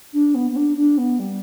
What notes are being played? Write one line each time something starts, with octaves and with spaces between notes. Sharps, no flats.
D4
B3
B3
D4
D4
B3
G3